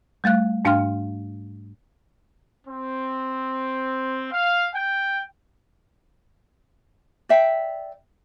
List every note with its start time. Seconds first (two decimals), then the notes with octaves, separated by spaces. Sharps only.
0.24 G3 A3 F5 F#6
0.65 G#2 D4 F5 G5 C6 F6
2.67 C4
4.32 F5
4.75 G5
7.29 D5 E5 G5